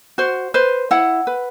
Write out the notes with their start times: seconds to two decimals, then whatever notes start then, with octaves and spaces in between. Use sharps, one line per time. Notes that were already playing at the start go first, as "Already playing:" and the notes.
0.18 F#4 C5
0.54 B4 C5
0.91 E4 F#5
1.27 B4